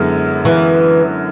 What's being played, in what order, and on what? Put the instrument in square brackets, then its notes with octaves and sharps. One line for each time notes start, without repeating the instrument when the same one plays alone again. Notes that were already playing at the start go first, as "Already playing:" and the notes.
Already playing: [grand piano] F#2 D3 G#3 B3 E4
[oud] E3